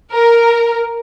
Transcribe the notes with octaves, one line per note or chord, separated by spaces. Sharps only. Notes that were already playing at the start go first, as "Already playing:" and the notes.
A#4